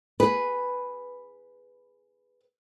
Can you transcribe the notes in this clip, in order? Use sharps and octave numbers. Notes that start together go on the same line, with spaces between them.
G#4 B4